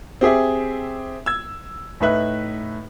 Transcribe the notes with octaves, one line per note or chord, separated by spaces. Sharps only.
C4 G4 G#4 E5
E6 G#6
A2 D#4 B4 E5 F#6